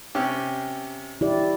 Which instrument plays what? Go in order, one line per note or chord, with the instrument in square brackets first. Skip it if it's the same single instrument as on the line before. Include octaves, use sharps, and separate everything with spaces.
[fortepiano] C3 C#4 G4
[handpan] E4 G4 D5